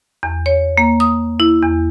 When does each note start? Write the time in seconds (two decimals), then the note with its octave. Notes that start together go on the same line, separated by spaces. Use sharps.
0.23 E2
0.46 C#5
0.78 A#3
1.00 D#6
1.40 E4
1.63 E2